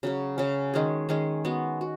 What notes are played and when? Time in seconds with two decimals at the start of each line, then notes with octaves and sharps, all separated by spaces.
0.03 C#3 F#3 C#4
0.38 C#3 F#3 C#4
0.74 D#3 G#3 C#4 G#4
1.09 D#3 G#3 C#4 G#4
1.45 G#3 B3 F#4
1.81 F#4